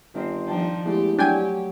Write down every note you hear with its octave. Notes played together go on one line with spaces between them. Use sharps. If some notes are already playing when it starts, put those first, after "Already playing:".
G1 D#3 C4 C5
F3 D4 D#4 G5 A5
E2 G#3 A3 G4
F#3 D4 G4 G5 G#5